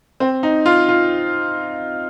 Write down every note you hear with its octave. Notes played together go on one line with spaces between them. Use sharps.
C4
D#4
F4
F4